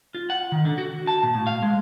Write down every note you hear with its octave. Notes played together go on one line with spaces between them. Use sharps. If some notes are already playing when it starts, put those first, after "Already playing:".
F4
F#5
D#3
D3
F#4
A5
A#2
A2
F5
G#3